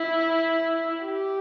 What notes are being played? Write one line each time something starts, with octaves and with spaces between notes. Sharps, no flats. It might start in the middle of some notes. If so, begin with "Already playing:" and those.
Already playing: E4
G4